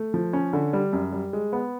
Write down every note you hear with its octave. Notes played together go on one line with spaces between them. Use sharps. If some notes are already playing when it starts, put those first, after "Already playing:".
Already playing: A3
F3
C#4
D3
G3
F#2
G3
G#3
B3